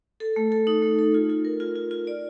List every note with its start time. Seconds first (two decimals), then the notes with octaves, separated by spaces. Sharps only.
0.20 A4
0.36 A3
0.52 A4
0.67 D#4
0.82 A3
0.99 A4
1.14 F4
1.30 F4
1.45 A#4
1.60 F4
1.76 F4
1.91 F4
2.07 D5